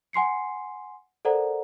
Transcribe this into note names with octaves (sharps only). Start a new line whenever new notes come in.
F#5 G#5 C6 C7 C#7
A4 A#4 C5 D5 F#5 A#5